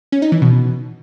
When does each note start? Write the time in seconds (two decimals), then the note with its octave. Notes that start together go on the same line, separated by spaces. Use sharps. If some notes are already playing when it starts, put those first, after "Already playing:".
0.12 C#4
0.22 D#4
0.32 E3
0.42 B2